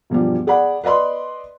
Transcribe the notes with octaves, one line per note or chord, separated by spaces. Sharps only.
E1 G2 F3 G3
G#4 D5 F#5 B5
B4 D5 D#5 B5 C6